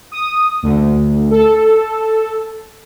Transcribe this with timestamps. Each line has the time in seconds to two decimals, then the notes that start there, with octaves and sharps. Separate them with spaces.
0.12 D#6
0.63 D2
1.31 A4